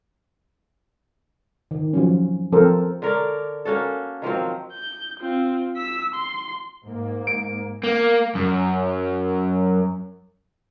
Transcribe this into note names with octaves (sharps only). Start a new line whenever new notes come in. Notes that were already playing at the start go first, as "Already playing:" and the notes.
D#3
F3 F#3 C#4
F3 C4 A4 A#4 C5
D3 A#4 C#5 D5
A#3 C#4 F#4 A4
D#3 F3 F#3 C4
G6
C4 F4
E6 B6
C6
G#2 A#3
D7
A#3
F#2